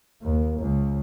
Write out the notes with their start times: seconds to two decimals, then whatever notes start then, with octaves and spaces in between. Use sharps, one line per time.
0.22 D#2
0.59 C#2